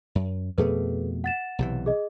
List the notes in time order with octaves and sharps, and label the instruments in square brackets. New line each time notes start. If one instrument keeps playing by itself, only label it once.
[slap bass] F#2
[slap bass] F2 B2 A3 [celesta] G#4 A4 B4
[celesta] F#5 A6 E7
[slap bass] B1 C3 E3
[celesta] G#4 D#5